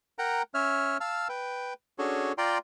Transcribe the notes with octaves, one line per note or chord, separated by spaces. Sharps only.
A#4 F#5 G5 A#5
C#4 C#5 E5 F6
F5 A5 E6 F6
B4 G5
C#4 D4 F#4 G#4 A4 C#5
F4 D5 G5 A#5 C6